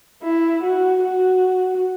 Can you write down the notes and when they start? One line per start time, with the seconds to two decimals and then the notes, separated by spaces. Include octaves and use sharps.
0.23 E4
0.63 F#4
1.04 F#4